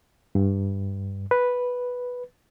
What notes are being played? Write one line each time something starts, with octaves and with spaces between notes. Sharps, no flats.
G2
B4